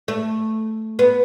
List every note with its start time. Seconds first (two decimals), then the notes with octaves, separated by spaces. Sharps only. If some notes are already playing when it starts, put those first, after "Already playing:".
0.08 A3
0.99 B3